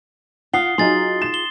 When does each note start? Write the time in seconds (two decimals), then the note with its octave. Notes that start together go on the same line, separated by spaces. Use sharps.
0.53 F4 F#5 D#6 C7 G7
0.78 F#3 D#4 F4 G#4 C6 A6
1.22 E7
1.34 G7